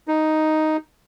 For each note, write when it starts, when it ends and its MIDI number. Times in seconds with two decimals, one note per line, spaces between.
0.08 0.77 63